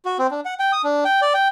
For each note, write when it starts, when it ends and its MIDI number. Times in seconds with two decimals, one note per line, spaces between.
0.05 0.18 66
0.19 0.27 60
0.31 0.41 62
0.45 0.54 78
0.59 0.72 79
0.73 0.82 87
0.84 1.04 62
1.05 1.20 79
1.22 1.33 74
1.34 1.48 79